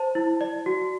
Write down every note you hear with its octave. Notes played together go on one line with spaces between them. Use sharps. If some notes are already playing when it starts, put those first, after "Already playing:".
Already playing: C5 A5
E4
D5
F#4